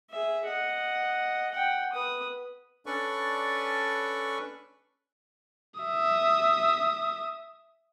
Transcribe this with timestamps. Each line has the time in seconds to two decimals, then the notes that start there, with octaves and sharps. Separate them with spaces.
0.11 G#4 E5
0.45 D#5 F#5
1.52 F#5 G5
1.93 B4 D#6
2.86 C#4 D4 A4 B4 D5 C#6
5.80 E5 D#6